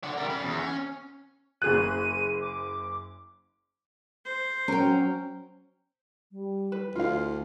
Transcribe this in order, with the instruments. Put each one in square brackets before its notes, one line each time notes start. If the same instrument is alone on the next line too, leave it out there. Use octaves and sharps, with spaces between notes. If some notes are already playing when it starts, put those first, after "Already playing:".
[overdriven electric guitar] D4 F#5
G3 A#4
C#4 B5
E2
C#4
[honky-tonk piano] F#1 G#4 F#6 [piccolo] D#7
[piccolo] D6
[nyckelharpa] C5
[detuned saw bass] F#3 [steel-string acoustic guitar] C#4 [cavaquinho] A#4 G5
[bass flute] G3
[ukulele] B4
[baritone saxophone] D2 [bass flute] E4 [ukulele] F4 F5